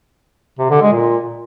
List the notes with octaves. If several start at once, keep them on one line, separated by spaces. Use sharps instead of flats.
C3
D3
G#3
A#2